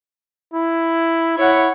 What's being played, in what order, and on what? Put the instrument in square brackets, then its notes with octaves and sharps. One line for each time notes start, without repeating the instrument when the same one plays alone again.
[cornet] E4
[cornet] E4 [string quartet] C#5 F#5